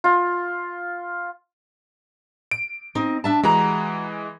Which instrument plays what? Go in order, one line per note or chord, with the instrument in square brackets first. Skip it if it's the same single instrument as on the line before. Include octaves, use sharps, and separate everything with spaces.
[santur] F4
[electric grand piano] D7
[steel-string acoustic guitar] C4 D#4
D4 E5 A5
[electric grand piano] E3 G#3 [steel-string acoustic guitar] F#4 A#5